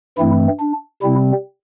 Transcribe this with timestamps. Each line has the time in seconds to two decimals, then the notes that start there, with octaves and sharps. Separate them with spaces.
0.18 G2 E3 A3 C4 E4
0.60 D4
1.02 C3 G3 C4 E4